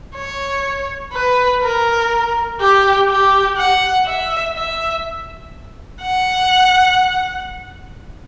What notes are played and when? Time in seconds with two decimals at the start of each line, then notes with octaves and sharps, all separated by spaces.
0.16 C#5
1.13 B4
1.63 A#4
2.61 G4
3.09 G4
3.58 F#5
4.06 E5
4.56 E5
6.02 F#5